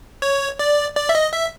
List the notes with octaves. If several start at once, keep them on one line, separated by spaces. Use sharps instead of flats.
C#5
D5
D5
E5
D#5
E5